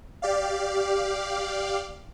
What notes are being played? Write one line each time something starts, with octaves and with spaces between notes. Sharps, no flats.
G4 D5 F5